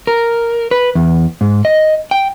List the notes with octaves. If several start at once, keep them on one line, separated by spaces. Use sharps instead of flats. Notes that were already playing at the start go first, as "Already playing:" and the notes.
A#4
B4
E2
G#2
D#5
G5